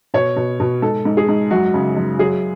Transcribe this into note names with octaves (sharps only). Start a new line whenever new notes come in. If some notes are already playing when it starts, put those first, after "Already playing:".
B2 C#5
B2
B2
G#2 A4
G#2
G#4
G#2
F#2 F#4
C#3
F#2
F#3 G#4